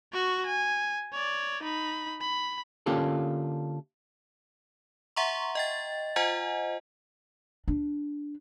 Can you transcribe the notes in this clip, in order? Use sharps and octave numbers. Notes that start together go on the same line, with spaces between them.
F#4 C#6
G#5
C#5 D5
D#4 B5
B5
D3 A#3 C#4 F4 G4 A4
E5 F#5 A#5 C6 C#6
D#5 G5 A6
F4 C5 D#5 F#5 G#5
D4